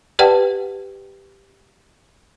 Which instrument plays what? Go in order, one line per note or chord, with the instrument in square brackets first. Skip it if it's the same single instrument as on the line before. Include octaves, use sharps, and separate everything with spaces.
[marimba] G4 B4 D5 F#5 G5 A5